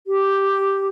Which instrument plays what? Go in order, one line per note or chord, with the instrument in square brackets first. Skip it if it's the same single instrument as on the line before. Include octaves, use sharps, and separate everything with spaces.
[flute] G4